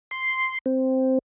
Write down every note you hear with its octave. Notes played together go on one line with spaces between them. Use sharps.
C6
C4